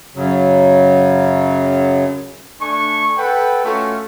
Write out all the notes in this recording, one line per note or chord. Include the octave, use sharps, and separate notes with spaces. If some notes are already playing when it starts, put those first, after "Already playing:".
F#2 C#3 F#3
A3 D4 G#5 C#6
A4 B4 F#5 G5
A3 C#4 F4 F#4 A4